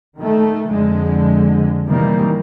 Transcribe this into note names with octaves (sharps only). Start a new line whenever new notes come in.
D#3 A3
F2 D3 G#3
C3 D#3 E3 G3 A#3